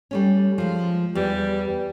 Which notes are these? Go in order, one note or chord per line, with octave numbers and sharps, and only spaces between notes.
G3 A3 C#4
F3 G#3
E2 G3